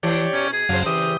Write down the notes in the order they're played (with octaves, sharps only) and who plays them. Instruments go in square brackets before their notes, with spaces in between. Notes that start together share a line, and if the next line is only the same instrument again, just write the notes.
[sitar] E3 [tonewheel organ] G4 C#5 D5
[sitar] B2 [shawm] C#4
[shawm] G#4
[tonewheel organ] F#2 F#3 F5 [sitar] C#3 C5
[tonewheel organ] E3 G4 [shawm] D#6